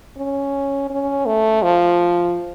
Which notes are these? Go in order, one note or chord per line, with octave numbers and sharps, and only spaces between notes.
C#4
C#4
A3
F3